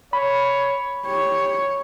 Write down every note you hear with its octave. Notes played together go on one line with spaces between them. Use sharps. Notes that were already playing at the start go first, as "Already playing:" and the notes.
C#5 B5
G4 C#5